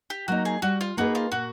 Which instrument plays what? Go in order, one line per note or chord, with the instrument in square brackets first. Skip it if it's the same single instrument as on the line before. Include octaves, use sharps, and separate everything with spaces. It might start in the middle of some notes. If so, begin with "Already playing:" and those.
[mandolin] G4
[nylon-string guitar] F#3 A#3 D#4 [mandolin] F#4
[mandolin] G#4
[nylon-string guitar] G3 [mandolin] F#4
[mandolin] F4
[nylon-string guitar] A#3 D#4 G#4 B4 [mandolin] F#4
[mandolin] F4
[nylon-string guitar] A#2 [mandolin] F#4